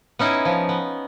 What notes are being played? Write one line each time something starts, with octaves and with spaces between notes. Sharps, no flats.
B3 C#4 D#4 E4
F3
B3